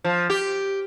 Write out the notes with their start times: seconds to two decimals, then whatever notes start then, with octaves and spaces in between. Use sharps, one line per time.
0.04 F3
0.30 G4